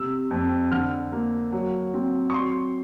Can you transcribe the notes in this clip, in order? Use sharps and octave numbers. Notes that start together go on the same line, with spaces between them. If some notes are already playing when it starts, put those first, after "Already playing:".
Already playing: C3 E6
F2
D3 F6
A#3
F#3
C4
C#6
F#3 C6